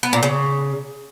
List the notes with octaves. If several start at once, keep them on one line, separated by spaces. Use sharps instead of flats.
B3
A#2
C#3